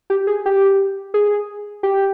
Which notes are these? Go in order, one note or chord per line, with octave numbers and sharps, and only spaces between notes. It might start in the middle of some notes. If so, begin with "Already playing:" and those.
G4
G#4
G4
G#4
G4